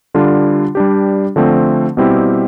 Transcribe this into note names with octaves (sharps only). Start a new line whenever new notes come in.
D3 G3 D4 F4
G3 D4 G4
D3 F3 A3 C4
B2 G3 C4 E4 G4